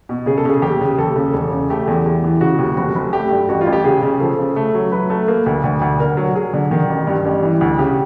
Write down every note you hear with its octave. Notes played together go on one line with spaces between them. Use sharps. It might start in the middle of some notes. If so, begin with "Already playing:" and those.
B2
C#3 G#4
A4
C#3 G#4
D#2 G4
C#3
D#2 A4
C#3
E1
C#3
A3 G4
E2
E2
E3
C#3 F#4
D#2
F1 F#4
F1
A3 G4
G2
A1 F#4
F4
A1
G4
C#3 G#4
C#3
F3 A4
C#3
A3
F#3
F#3 B4
A3
A#3
D2
D2
D2
D3 A#4
F#3
F#3 G#4
D3
D#3
A1
G2
A1
E3
D2
C#3 G4